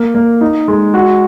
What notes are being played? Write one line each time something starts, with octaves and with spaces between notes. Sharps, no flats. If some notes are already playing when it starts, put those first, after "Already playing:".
Already playing: A#3
A#3
D#4
G#3
F#4